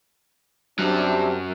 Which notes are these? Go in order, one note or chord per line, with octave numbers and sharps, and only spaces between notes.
F#2 C3 F#3 G3 D4